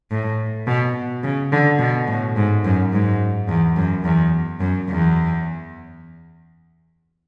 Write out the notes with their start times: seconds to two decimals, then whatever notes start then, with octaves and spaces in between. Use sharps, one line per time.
0.11 A2
0.67 B2
1.24 C#3
1.52 D3
1.79 B2
2.08 A2
2.36 G#2
2.64 F#2
2.93 G#2
3.48 E2
3.76 F#2
4.04 E2
4.60 F#2
4.89 E2